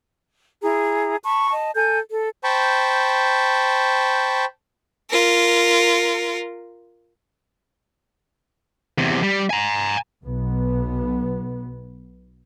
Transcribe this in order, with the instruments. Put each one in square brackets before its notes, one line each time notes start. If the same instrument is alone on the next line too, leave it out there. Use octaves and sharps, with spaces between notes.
[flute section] E4 G#4 A#5
A5 B5 C#6
D#5 A5
A4 G#5 G6
A4
[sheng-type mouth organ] C5 G5 A5 B5 C#6
[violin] F4 A#4
[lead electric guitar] E2 C3
G3
G#5 A#5
[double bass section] B1 B3